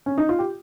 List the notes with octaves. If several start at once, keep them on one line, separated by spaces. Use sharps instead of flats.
C#4
D#4
F4
G4